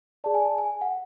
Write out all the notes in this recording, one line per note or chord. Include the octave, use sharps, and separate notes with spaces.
G#4 D5 A5
G#5
A5
G#5
F#5